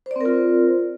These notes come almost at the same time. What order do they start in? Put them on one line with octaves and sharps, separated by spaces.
C5 D5 C4 A#4 F4